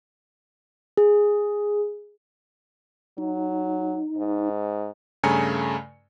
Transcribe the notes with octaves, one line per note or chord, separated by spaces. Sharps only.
G#4
F#3 D#4
G#2
G2 C#3 A3 G#5 A#5 C#7